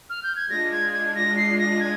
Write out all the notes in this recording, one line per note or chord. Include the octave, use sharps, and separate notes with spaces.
F6
G6
G#6
G#3 D4 F4 A#6
G#6
G#6
A#6
C7
A#6
G#6